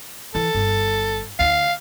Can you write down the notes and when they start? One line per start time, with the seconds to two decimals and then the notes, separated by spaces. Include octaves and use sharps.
0.35 E3 A4
0.54 G1
1.39 D2 D#4 F5